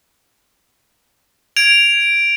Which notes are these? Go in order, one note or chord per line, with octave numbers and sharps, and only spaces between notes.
G#6 D7 F7